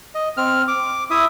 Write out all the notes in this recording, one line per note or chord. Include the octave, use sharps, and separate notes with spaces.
D#5
C4 F6
D6
E4 E5 D#6